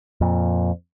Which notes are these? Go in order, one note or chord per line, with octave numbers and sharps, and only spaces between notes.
F2 A#2